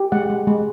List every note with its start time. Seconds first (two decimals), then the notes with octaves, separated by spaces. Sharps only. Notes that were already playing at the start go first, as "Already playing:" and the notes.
Already playing: G4
0.12 G#3 F#5
0.30 G#3
0.47 G#3